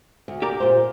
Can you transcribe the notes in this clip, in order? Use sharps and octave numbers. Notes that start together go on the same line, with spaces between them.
D2
G4 A#4 D5
A#2 C5